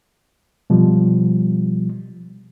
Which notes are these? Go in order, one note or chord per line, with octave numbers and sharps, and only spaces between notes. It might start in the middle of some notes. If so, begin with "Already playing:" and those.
B2 F3 G3